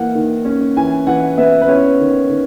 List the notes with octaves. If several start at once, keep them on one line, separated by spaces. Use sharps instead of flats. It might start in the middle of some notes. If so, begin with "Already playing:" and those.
Already playing: E3 A#3 F#5
D#3
C#4
E3 G#5
E3 F#5
B3 E5
B4
C#4 C#5
D#3
D#3